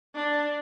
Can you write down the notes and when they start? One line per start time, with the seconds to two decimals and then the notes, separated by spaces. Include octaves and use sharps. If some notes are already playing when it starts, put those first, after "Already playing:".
0.15 D4